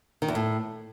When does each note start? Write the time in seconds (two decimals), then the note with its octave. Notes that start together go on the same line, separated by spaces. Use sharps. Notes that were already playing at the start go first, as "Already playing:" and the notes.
0.22 D#3
0.28 E2
0.35 A2